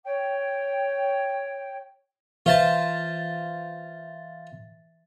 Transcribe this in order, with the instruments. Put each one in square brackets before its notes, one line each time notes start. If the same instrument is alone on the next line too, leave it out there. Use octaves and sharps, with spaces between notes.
[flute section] C#5 G5
[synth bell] E3 E5 A6 [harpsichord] F4 C5 A5